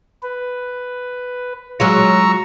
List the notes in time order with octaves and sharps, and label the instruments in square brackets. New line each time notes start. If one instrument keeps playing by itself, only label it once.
[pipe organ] B4
[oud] F#3 G#3 F4 [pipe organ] A#5 C#6 E6